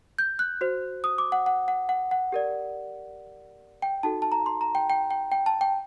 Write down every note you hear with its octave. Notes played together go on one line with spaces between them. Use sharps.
G6
F#6
F#4 C5
D#6
D6
F#5
F#5
F#5
F#5
F#5
G4 A#4 D5
G5
D#4 F#4 A4 A5
A5
A#5
C6
A#5
G5
G5
G5
G5
A5
G5